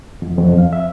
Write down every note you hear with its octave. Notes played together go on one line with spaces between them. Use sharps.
F2
F2
F5
E5